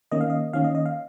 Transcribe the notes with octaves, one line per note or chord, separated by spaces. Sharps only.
D#3 A#3 C#4 D#5
F5
D#5
D#3 A#3 C#4 F5
D#5
D#5
F5